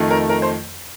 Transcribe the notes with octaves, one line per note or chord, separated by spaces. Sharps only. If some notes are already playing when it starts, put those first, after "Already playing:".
Already playing: F2 D#3 A3
A#4
A#4
C5